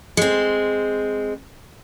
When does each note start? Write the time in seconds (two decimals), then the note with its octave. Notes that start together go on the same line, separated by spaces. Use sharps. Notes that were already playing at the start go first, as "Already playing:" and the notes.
0.17 G#3 C4